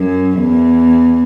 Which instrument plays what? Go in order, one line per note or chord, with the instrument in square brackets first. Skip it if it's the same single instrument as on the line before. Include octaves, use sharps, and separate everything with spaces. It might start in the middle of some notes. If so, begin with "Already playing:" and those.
Already playing: [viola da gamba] F#2
E2